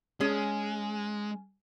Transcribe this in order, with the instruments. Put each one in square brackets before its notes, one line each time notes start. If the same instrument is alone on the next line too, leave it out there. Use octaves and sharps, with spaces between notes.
[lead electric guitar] G#3 [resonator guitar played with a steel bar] C#4 G#4